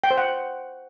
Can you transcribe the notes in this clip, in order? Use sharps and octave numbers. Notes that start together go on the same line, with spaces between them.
G5
C5
F#5